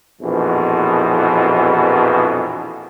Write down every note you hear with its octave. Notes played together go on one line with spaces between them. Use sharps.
A#1 F2 B2 E3